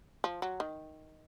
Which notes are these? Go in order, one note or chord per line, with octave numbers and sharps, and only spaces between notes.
F3
F#3
D#3